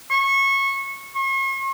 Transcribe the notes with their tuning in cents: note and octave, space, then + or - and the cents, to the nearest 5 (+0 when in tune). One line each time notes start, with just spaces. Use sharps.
C#6 -20
C#6 -45